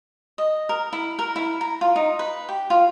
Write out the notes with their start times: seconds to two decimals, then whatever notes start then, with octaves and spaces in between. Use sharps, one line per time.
0.38 D#5
0.69 A#4
0.93 E4
1.19 A#4
1.36 E4
1.61 A#5
1.81 F4
1.96 D#4
2.19 B4
2.49 G4
2.70 F4